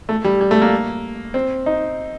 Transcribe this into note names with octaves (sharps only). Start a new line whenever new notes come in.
A3
G3
G3
A3
A#3
C4
D#4